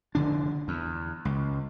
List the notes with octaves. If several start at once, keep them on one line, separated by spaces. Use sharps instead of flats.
F1 D3 D4
E2
C#2